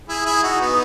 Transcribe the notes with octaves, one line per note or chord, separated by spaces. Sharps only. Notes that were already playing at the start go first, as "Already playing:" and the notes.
E4 G#4
E4 G#4
D#4 F#4
B3 D#4